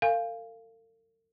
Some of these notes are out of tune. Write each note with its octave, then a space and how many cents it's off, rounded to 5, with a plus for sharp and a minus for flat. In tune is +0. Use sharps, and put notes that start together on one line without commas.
A4 +45 F5 -10 G#5 +0